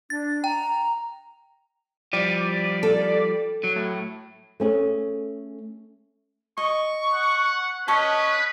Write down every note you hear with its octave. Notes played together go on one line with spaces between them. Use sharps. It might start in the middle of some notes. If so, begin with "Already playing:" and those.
D4 A6
G5 A#5
F3 G3 D5
A4
F#3
A2
A3 C#4 G#4
D#5 C#6
F#5
C#4 B4 C#5 D#5 A5